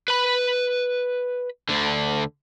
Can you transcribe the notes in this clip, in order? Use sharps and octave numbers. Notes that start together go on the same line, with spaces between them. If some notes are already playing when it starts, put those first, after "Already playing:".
B4 B5
D2 D3